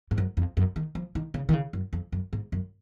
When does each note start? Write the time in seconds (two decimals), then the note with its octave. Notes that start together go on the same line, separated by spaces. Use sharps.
0.11 G#2
0.18 F#2
0.37 F2
0.57 F#2
0.76 D#3
0.95 F3
1.15 D#3
1.34 C#3
1.49 D#3
1.54 C#3
1.73 F#2
1.93 F2
2.12 F#2
2.33 G#2
2.52 F#2